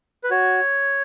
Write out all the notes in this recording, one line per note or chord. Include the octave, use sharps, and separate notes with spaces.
B4
F#4 C#5